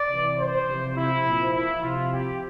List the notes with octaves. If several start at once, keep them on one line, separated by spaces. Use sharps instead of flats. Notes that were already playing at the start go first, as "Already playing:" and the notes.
Already playing: D5
C3 E3
C5
C3 F3
E4
A#2 F3
E4
C3 F3 F4
G4